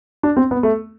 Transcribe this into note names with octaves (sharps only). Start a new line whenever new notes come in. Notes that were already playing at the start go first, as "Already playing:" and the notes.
D4
C4
B3
A3